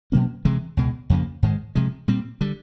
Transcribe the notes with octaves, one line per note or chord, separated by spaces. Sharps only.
B2 F#3 A#3 C#4
C3 E3 G#3
C#2 B2 G#3
F2 C#3 F3 A#3
G#2 D#3 G#3
C3 F3 G#3
A#2 G3 C4
D3 G3